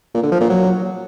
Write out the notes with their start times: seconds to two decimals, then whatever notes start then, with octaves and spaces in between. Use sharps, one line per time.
0.14 A#2
0.23 D3
0.32 F3
0.41 A#2
0.50 F#3